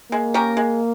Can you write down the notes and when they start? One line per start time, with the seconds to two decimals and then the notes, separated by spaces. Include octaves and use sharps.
0.11 G#3 A#3
0.34 C#4 G4 A#4
0.57 G#3